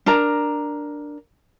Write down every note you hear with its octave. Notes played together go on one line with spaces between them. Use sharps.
D4 A#4 A#5